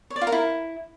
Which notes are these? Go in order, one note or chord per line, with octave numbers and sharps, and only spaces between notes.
C#5
D5
F4
A#4
E4